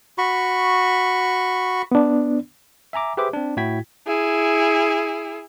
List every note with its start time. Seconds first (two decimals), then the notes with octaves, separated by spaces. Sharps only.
0.18 F#4 B5 C#6
1.92 B3 D4
2.93 E5 G#5 A#5 D6
3.17 G4 G#4 B4 C5 E5 D6
3.33 C4 D4
3.57 A2 E4 F#4 G5 G#6 B6
4.07 E4 G#4